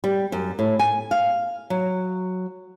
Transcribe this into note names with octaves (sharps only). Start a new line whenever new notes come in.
G3
F#2
A2
G#5
F5
F#3